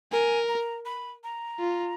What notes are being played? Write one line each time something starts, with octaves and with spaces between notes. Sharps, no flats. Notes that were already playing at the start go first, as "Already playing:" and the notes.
A#4 G#5
A#5
B5
A#5
F4